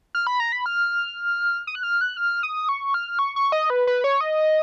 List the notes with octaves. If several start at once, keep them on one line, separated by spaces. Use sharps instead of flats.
F6
B5
A#5
B5
F6
D#6
F#6
F6
F#6
F6
D#6
C#6
F6
C#6
C#6
D#5
B4
B4
C#5
D#5